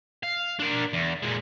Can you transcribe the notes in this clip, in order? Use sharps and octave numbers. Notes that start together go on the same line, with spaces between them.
F5
D4 A#4
E2
A#2 G#3